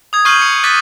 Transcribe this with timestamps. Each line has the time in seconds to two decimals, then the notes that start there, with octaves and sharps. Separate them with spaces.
0.13 D#6 G#6
0.25 C#6 F6 G6 C7 D#7 F#7
0.42 C#7
0.63 D6 F#6 A6 B6